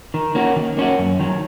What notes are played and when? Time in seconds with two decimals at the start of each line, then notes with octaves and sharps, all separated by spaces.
0.14 D#3
0.35 A#3 C#4 F#4
0.56 D#3
0.77 A#3 C#4 F#4
0.98 F#2
1.20 D#3 F#3